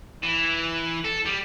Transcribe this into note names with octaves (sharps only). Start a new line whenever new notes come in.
E3
A4
G3